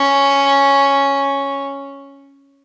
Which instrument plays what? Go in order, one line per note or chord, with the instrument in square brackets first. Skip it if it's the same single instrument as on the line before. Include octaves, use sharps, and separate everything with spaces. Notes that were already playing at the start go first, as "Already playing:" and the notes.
Already playing: [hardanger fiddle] C#4